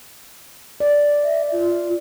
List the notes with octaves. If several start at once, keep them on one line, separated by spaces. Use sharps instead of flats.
D5
E5
F4